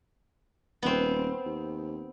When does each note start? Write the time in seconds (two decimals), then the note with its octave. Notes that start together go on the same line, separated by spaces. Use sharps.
0.82 D#1 B3 C4
1.46 D#2